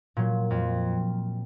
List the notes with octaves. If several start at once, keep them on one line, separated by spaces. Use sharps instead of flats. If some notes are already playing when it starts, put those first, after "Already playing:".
A#2 F#3
F2